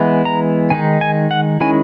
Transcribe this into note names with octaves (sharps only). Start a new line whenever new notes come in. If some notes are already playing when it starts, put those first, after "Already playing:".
Already playing: E3 G#3 B3 E4
A#5
D#3 G#3 D#4 G#5
G#5
F#5
D#3 G#3 C#4 E4 G#5